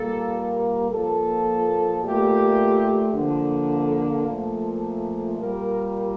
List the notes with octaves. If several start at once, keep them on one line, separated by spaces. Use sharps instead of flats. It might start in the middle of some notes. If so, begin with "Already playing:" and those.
Already playing: A#2 G3 A#3 A4
A#4
A#2 F3 A#3 A4
A#2 A3 G4
D3 F3 A#3
A4
A#2 F3 A3
A#2 G3 A#3 A#4